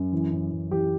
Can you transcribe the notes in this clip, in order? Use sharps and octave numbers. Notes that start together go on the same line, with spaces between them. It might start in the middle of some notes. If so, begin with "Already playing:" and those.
Already playing: F#2
E3
F#2
F#2
E3 G4